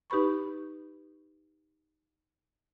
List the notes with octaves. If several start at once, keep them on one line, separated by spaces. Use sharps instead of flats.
D#4 G4 B4 B5 C#6